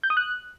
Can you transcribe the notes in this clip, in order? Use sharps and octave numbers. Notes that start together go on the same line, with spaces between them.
G6
D#6
F#6